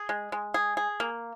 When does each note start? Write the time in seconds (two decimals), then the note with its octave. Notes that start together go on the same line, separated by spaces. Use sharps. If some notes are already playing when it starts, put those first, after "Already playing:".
Already playing: G#4
0.09 G#3
0.32 G#3
0.54 G#4
0.77 G#4
1.00 A#3